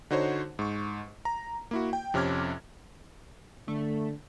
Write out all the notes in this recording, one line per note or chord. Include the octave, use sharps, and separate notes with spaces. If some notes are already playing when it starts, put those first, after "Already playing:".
D3 D#4 F#4 C5 C#5
G#2 C#6
A#5
A#3 E4 F#4
G5
F2 C3 C#4 D6 F6 G#6
D3 A3